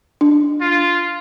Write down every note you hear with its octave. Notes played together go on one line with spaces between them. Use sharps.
D4
F4